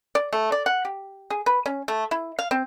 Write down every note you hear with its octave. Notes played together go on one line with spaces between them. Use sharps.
D5
A3
D5
F#5
G4
G#4
B4
C#4
A3
E4
F5
C4